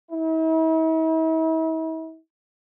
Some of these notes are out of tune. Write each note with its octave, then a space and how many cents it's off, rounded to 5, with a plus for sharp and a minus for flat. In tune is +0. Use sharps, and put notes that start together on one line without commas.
E4 -45